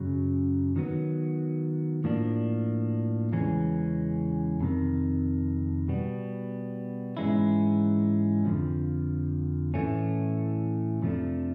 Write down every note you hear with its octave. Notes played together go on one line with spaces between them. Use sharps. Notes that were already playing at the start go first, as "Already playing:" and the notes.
Already playing: F#2 C#3 F#3
D#3 F#3 B3
A2 F3 A#3 D4
E2 C#3 E3 G#3 C#4
F2 C3 D#3
B2 G3 B3
G#2 E3 G#3 C#4 E4
F2 D3 F3
A2 E3 A3 C#4
F2 C3 F3 A3 D4